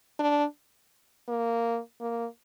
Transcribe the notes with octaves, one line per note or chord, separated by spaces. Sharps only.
D4
A#3
A#3